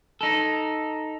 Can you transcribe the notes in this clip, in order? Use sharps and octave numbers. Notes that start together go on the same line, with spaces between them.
D#4 A4